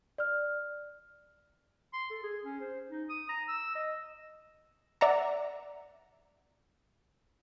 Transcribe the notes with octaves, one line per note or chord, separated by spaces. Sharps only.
D5 F6
C6
A4
G#4
C#4
C5
D#4
D#6
A#5
E6
D#5
D5 E5 F#5 A#5